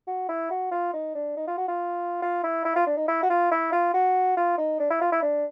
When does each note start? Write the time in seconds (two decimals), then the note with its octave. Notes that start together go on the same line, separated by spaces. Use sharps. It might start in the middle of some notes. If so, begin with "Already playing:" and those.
0.07 F#4
0.29 E4
0.50 F#4
0.71 F4
0.93 D#4
1.15 D4
1.37 D#4
1.47 F4
1.58 F#4
1.68 F4
2.22 F4
2.43 E4
2.65 E4
2.76 F4
2.87 D4
2.97 D#4
3.08 E4
3.23 F#4
3.30 F4
3.51 E4
3.72 F4
3.94 F#4
4.37 F4
4.58 D#4
4.80 D4
4.90 E4
5.01 F4
5.12 E4
5.22 D4